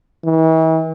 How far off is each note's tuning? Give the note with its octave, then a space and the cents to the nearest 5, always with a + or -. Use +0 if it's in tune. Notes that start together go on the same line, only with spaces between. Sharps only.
E3 -40